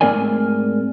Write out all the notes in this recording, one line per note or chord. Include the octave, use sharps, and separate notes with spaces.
G#2 A3 C4 A#4 D5 G#5